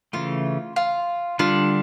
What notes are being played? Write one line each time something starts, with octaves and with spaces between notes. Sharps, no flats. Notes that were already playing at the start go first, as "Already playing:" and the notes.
C#3 E3 A3 F4
F4
D3 G3 D4 F4